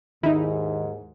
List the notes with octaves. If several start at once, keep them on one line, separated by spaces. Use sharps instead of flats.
D#2 G#2 D#3 D#4 E4